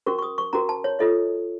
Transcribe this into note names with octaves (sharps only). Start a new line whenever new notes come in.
C#4 F#4 A#4 C#6
C#6
D#6
C#6
C#4 F#4 A#4 A#5
A5
C#5
F4 A4 C#5 D#5